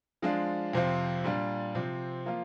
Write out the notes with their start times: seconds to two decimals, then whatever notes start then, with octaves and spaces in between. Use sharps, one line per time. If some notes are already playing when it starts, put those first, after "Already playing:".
0.22 F3 G#3 D4 F4
0.73 F2 C3 F3 C4 F4
1.24 A#2 G3 D4 F4
1.75 C3 F3 C4
2.26 F3 A#3 F4